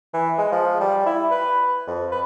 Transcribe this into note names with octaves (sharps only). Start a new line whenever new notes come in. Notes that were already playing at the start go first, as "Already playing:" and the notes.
E3
G#3
F3
G3
E4
B4
F2
B4